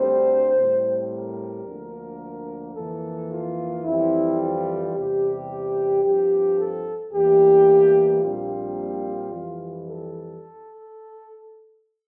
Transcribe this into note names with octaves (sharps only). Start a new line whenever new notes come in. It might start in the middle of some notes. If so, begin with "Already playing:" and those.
Already playing: D2 D3 G3 C4 C5
A2 G3 C4
A#4
D2 D3 F3 A#3
F2 E3 A#3 A4
F4
F2 E3 G3 C4 E4
F4
E2 C3 G3 G4
G2 F3 C4 G4
A4
E2 E3 G3 A#3 G4
A#1 A#2 G3 C4 F4
F2 E3 G3
A4